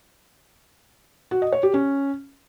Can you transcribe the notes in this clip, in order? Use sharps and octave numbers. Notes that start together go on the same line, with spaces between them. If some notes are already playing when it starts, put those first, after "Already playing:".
F#4
D#5
C#5
G4
C#4